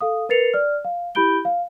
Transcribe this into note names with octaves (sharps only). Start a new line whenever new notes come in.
A4 F5 D#6
A#4 B4 A6 C7 C#7 F7
D5 F6
F5
E4 G4 B5 G6 D7 G7
F5